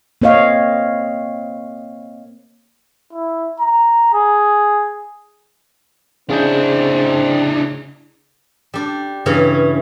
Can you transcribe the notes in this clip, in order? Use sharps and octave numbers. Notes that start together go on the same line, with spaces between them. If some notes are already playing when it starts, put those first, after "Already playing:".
A#3 C4 C#5 D#5 F5
E4
A#5
G#4
C#3 C4 D4 E4 G#4 G6
G3 D4
G2 C#3 E3 C#4